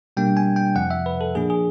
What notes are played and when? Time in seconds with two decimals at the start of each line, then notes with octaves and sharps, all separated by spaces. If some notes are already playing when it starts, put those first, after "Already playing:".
0.17 B2 G3 A#3 D4 G5
0.37 G#5
0.56 G5
0.76 F2 C3 F3 F#5
0.91 E5
1.06 B4
1.21 A4
1.35 A#2 F3 A#3 D4 G#4
1.50 G#4